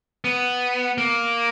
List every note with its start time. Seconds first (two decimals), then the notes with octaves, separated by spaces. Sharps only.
0.24 B3
0.98 A#3